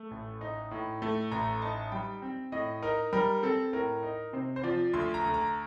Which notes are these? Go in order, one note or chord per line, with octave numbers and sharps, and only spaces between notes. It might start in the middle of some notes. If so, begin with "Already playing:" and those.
Already playing: A3
A1
D#4
A2
A3
A1 A#5
D#4 A5
G3 G5
C4
A2 D#5
D#4 A#4
G3 A#4
C4 A4
A2 A#4
D#4
C3 C5
C5
F3 D5
D2 C6
A#5
D2
A#5